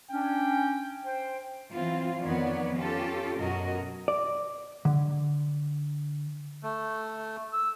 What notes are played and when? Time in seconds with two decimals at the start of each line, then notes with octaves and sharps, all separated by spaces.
0.11 C#4 D4 G5
1.05 C5 G5
1.72 E3 F#3 C4 F4
2.21 F2 D#3 B3 C#5 D5
2.76 C#4 F4 G4 A4
3.36 F#2 B2 C#4 F#4 A#4 D#5
4.08 D5
4.85 D3
6.63 A3
7.53 E6